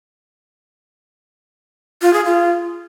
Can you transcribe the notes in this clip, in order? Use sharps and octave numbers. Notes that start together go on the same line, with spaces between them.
F4
G#4
F4